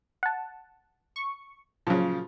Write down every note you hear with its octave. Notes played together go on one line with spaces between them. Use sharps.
F#5 A5
C#6
A#2 C#3 F3 F#3